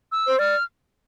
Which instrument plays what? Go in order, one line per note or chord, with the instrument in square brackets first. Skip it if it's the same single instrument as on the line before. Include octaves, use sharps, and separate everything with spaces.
[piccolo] E6
[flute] C5
[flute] D5 [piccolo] F6